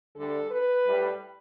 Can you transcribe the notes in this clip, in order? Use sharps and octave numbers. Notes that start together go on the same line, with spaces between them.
D2 D3 G3 A4
B4
A2 G3